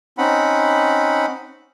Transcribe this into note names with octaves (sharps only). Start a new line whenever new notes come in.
C4 C#4 D#4 F#5 B5